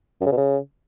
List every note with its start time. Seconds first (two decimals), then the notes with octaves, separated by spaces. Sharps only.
0.21 F#2
0.26 C#3
0.32 B2
0.37 C#3